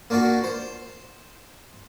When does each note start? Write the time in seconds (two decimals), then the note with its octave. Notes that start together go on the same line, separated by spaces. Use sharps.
0.10 A#3 D4 F4 F#4
0.44 C5